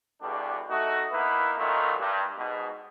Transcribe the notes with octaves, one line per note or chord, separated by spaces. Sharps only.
E2 G2 B2 D3 D4 G4
A3 D#4 F#4
A#3 B3 D#4 E4 B4
A#2 D#3 F#3 A3 B3 F4
G2
G#2 B2